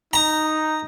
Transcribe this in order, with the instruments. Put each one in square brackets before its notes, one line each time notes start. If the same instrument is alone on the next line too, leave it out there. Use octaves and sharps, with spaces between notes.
[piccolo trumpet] D#4 [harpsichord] A#5